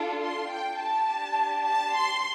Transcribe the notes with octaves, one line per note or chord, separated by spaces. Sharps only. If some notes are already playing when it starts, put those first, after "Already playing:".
Already playing: D4 F4 A4
C6
G5
D4 G4 A5
A5
C6